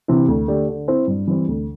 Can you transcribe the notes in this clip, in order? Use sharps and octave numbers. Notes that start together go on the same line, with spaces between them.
C3 E3 C4 E4
D2
D3 A3 D4 G4
D3
C4 E4 C5
G2
E3 G3 C4
D2